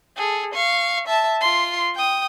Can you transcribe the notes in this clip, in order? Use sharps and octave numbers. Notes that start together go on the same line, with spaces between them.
G#4 A4
F5 C#6
E5 A5
F4 C6
G5 D#6